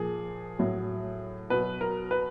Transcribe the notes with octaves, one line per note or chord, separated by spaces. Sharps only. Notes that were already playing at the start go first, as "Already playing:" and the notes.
Already playing: A#2 F3 G#4
A2 F#3
B2 F#3 B4
A#4
B4